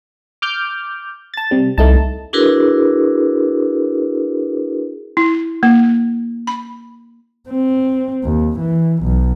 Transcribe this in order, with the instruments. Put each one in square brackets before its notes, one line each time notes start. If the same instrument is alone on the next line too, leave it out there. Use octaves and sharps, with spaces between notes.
[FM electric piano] D6 F6 G6
A5 A6
C3 G3
[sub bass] C2 [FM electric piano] A3 D#4 A5
[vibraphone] D4 E4 F#4 G#4 A#4 B4
[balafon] E4
A#3
B5
[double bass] C4
D#2
E3
B1